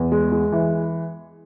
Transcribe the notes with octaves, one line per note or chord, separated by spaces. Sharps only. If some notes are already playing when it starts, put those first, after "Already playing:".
Already playing: E2
G#3
G#3
E3